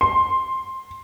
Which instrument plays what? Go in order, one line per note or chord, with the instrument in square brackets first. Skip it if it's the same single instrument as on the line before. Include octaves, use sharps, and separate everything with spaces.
[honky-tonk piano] C6